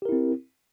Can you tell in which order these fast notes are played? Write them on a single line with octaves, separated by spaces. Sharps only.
G4 A#4 E4 C4